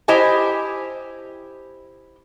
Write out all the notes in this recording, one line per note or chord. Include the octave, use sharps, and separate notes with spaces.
E4 G4 C5 D#5 G#5